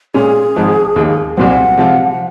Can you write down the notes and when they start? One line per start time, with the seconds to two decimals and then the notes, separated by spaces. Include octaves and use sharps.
0.14 A#2 G#3 C#4 G#4
0.56 G#1 G#2 F3
0.96 D#2 D#3 A#3
1.37 C2 A#2 F#3 C4 F#5
1.77 C3 F3 G#3 C4 F4